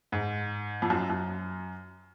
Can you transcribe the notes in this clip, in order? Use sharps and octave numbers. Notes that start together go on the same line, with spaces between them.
G#2
F2
F#2
F#2